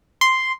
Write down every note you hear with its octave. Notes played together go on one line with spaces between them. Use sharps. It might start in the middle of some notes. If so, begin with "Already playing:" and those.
C6